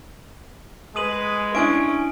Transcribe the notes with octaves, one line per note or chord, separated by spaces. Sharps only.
G#3 B4 D#6 D#7 F#7
C#4 D4 E4 E5 G#5 D7